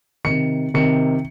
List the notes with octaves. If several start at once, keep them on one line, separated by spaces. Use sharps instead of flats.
C3 D#3 C#7
C3 D#3 C#7